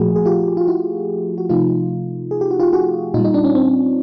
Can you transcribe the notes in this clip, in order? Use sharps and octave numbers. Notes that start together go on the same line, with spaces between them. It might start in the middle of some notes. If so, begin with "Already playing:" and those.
Already playing: A#2 F3 A3 F#4 G#4
G#4
F4 G4
F4
E4 F#4
F#4
C3 F3 A3 D#4 F4
G#4
G4
F#4
F4 G4
F#4 G#4
A#2 G3 D#4 F4
D#4
D4
C#4
C4